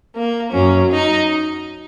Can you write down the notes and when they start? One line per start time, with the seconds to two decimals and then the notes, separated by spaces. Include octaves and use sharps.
0.15 A#3
0.52 F#2 F#3 C#4
0.90 D#4